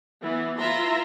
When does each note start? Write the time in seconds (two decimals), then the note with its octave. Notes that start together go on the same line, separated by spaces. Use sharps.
0.22 E3 B3
0.57 E4 F4 B4 E5 A#5 C6